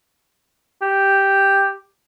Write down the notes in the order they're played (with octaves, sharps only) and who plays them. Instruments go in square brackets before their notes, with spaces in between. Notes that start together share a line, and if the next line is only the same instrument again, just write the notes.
[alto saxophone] G4